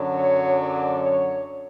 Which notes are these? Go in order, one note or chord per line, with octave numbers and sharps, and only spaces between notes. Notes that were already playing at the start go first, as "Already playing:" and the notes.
Already playing: F#2 D3 F#3
C#5
D5
C#5